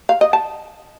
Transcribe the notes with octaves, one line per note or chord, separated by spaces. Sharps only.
F5
D#5
A5